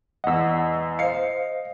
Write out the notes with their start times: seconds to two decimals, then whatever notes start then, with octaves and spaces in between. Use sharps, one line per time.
0.24 E2 D#5 F#5 E6
0.99 C5 D#5 F5 C7 C#7